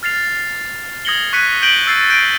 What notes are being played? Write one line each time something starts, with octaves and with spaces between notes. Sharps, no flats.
F6 A6 C7 F7
D#6 G#6 A#6 C#7 F#7 G7
C#6 F#6 G#6 B6 C#7 D#7
G6 A#6 D7 F#7 G7
E6 G#6 A6 C7
G6 A#6 D7 D#7